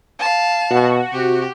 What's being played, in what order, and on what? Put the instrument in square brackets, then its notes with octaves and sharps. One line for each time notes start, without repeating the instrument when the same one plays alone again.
[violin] F5 A5
[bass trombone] B2 [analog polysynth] F#4
[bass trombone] C3 [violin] G4